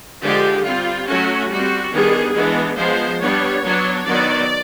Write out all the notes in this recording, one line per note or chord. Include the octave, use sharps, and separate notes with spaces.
D3 F3 G#3 G4
G3 C4 F4
F#3 A3 C#4 F#4
G3 C4 F#4
D#3 G3 B3 D4 G#4
E3 G#3 B3 D4
F3 G#3 B3 C5
G3 B3 D4 C#5
F#3 B3 D4
D#3 F#3 B3 D5